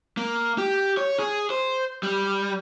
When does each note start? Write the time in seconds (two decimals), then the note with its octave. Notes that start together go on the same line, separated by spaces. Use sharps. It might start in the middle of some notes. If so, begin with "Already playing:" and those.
0.17 A#3
0.58 G4
0.97 C#5
1.19 G#4
1.50 C5
2.03 G3